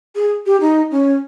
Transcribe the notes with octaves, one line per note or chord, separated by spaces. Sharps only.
G#4
G4
D#4
C#4